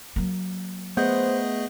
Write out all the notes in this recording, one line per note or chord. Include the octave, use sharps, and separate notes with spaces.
F#3 A#3
A3 B3 G#4 C5 D#5 F#5 G6